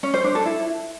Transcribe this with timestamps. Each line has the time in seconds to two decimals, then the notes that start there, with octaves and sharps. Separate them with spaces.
0.03 C#4
0.14 C5
0.24 D4
0.35 A4
0.45 E4